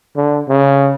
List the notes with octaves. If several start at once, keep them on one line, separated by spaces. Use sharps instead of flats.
D3
C#3